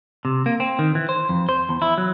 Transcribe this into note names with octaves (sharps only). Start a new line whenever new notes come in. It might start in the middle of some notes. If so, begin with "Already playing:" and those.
C3
A#3
C4
D#3
E3
C5
F2
C5
E2
E4
F#3